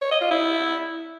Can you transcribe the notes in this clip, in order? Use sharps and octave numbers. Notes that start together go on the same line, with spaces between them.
C#5
D#5
F4
E4